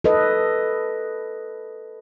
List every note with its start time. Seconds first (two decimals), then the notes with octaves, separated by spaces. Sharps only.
0.04 A4 B4 D#5